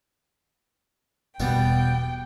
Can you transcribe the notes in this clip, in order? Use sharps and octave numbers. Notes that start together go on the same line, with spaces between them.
E1 B2 G3 B3 F#4 G5